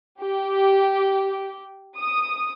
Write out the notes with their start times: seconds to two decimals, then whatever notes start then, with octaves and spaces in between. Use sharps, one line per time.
0.20 G4
1.98 D#6